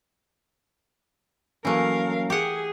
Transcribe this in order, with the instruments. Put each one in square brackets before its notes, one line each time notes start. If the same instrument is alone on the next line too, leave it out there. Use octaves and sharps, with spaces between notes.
[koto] E3 A3 [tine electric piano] F#3 A#3 C#4 [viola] A#4 F5
[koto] G4 F#5 [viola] G#4